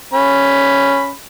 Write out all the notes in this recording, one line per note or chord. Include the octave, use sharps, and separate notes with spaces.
C#4 B5